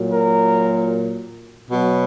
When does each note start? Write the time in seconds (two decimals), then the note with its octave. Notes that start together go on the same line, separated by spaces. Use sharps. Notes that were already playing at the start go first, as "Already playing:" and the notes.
Already playing: A#2 F#3
0.11 A#4
1.69 B2 F#3